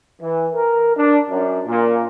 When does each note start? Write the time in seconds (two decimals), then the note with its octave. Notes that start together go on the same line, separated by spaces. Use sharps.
0.21 E3
0.54 A#4
0.96 D4
1.30 F#2
1.66 A#2